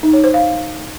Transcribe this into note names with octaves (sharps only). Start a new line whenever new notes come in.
D#4
C#5
C5
F5